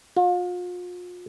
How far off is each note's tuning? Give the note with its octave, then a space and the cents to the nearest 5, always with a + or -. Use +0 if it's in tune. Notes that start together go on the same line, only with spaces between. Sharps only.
F4 +40